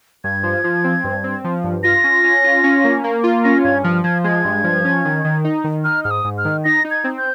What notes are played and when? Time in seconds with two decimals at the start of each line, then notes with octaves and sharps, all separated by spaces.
0.24 G2 G#6
0.43 F3
0.64 F3
0.84 C4
1.04 G2
1.24 C4
1.44 F3
1.64 G2
1.83 F4 A#6
2.04 C#4
2.24 C#4
2.44 F4
2.64 C#4
2.84 A#3
3.04 A#3
3.24 F4
3.44 C#4 A#6
3.64 G2 G#6
3.84 F3 F6
4.04 F3 G#6
4.24 G#3 G#6
4.45 G2
4.64 F3
4.85 C#4
5.05 D#3
5.24 D#3
5.44 D#4
5.64 D#3
5.84 D#4 F6
6.04 G#2 F6
6.11 D#6
6.25 G#2
6.38 F6
6.45 D#3
6.64 D#4 A#6
6.84 D#4
6.91 G#6
7.04 C4
7.18 G6